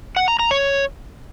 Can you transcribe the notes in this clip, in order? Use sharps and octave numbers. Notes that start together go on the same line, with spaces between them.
F#5
A#5
A#5
C#5